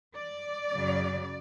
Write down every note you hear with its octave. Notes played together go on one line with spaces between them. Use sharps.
D5
F#2 C#3 F#3